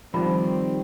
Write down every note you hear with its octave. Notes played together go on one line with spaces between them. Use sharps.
D#3 F3 G3 C4 D#4 B5